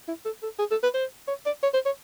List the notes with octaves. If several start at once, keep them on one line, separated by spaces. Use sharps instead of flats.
E4
A4
A4
G#4
A4
B4
C5
C#5
D5
C#5
C5
C#5